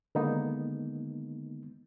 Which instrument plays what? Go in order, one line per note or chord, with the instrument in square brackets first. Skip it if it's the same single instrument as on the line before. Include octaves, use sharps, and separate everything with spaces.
[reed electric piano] D3 D#3 G#3 A#3 B3 D#4